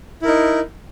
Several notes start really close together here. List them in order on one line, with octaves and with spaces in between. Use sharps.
E4 A#4 D#4